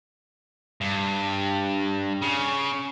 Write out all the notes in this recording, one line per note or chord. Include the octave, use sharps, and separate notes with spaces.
G2
C#3